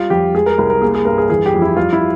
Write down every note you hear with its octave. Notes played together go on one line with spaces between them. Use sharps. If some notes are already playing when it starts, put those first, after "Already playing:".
Already playing: G3 F4
F2 G4
G#3 G#4
A#4
C2 A#4
A#4
A#3 G#4
G#4
G2 A#4
G#4
E3 G#4
G4
F2
E4
G3 F4
E4